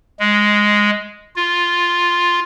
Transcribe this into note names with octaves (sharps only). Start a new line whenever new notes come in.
G#3
F4